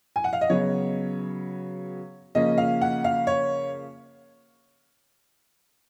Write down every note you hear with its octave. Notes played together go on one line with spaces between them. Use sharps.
G#5
F#5
F5
D#5
C#3 F#3 B3 C#5
C#3 F3 A#3 C#4 D#5
F5
F#5
F5
C#5